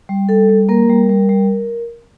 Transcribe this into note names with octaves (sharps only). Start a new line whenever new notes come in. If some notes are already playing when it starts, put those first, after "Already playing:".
G3
G3 A4
G3
A#3 A#4
G3
G3
G3